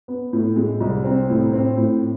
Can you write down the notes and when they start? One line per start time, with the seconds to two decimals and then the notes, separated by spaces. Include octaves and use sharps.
0.08 B3
0.33 A2
0.56 G#3
0.80 C2
1.04 C4
1.30 A2
1.53 C4
1.77 A2